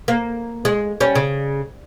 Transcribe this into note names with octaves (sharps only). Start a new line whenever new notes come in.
A#3
G#3
G3 C#4
C#3